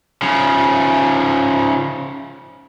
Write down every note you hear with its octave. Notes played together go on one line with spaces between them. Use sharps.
C#3 F3